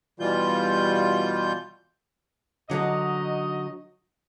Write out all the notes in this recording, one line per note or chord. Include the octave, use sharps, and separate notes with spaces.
B2 E3 G3 F4 G6
D3 F#3 D#4 D#5